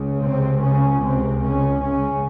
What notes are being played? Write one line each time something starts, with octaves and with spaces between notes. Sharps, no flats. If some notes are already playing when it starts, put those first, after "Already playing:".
Already playing: C#2 C#3
C3 C4
C#3 C#4
C3 C4
C#3 C#4
C#3 C#4